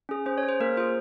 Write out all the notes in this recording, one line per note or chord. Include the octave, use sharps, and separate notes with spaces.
C#4 G#4
C#4 C5
C#5
G#4
C5
A#3 A#4
F4 G#4 C5